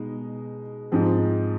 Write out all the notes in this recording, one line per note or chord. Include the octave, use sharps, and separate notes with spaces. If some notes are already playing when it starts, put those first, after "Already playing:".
Already playing: B2 G#3 D#4
G#2 F3 C4